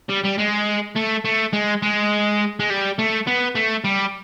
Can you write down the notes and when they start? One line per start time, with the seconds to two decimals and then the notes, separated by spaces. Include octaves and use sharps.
0.09 G3
0.24 G3
0.38 G#3
0.95 A3
1.25 A3
1.53 G#3
1.83 G#3
2.60 G#3
2.70 G3
2.99 A3
3.27 B3
3.55 A3
3.84 G3